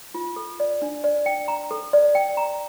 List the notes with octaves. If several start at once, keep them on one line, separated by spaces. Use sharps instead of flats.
F4
A4
D5
D4
D5
G5
A#5
A4
D5
G5
A#5